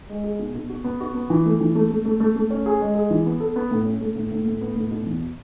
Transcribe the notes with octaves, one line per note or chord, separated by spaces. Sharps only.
G#3
G#4
B2
B2
F#4
B3
F#4
B3
E3
A3
E3
A3
A3
A3
A3
A3
C#4
G#4
G#3
G#4
E3
B3
A4
B3
A2
C#4
A3
A2
A2
A2
B3
A2
B2
E2